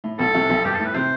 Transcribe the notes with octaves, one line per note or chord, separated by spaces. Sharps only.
A2
B1 B2 A4
C2 C3
B1 B2
G2 G4
A2 A4
B4
C3 C5